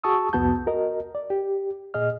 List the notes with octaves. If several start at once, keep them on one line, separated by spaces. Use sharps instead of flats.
F#4 G#4 A5 C#6 D#6 E6
C2 F2 B3 F#4 A5 G6
F#4 A#4 D#5
D5
G4
A#2 G#4 D#5 F6